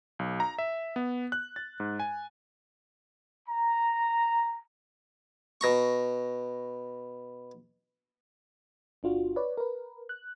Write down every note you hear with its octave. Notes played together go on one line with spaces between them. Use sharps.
B1
A#5
E5
B3
F#6
A6
G#2
G#5
A#5
B2 A#5 C#6
G1 D4 F4 F#4
B4 C#5 D5
A#4 B4
F#6